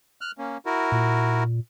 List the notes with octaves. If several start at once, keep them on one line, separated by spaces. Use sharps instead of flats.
F6 F#6
A#3 C#4
E4 F#4 A#4
A#2